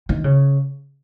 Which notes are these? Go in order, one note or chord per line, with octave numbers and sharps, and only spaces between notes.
D#3
C#3